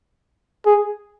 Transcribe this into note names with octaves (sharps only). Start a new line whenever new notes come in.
G#4